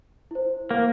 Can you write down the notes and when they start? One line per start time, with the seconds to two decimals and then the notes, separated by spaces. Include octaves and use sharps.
0.31 E4 C5
0.71 A#3